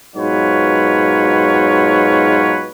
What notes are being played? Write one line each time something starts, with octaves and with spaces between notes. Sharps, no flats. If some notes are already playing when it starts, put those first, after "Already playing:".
G#2 B2 F#3 F4 B4 C#5